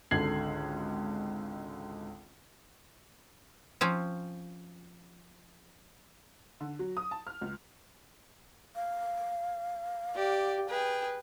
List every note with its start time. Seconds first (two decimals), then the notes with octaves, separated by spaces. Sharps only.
0.11 G#1 C#2 D3 G#6 C7 F#7
3.81 F3 C4 C#4
6.61 D3
6.79 F#3
6.97 D#6
7.11 A5
7.27 F6
7.41 C#2
8.75 F5
10.15 G4 D5
10.70 G#4 B4 G5